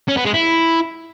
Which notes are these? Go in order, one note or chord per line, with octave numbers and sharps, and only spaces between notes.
C#4
B3
G#3
E4